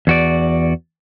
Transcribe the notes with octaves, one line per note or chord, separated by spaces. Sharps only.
E2 F#4 D5